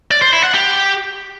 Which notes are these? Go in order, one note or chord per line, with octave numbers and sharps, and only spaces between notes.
D5
C5
E4
F#5
G4